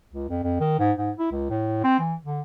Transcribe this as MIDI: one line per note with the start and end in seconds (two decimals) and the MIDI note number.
0.12 0.29 37
0.29 0.42 41
0.43 0.57 41
0.60 0.78 51
0.79 0.92 44
0.98 1.10 44
1.19 1.30 64
1.32 1.49 37
1.50 1.82 45
1.84 1.98 60
1.99 2.14 52
2.24 2.41 50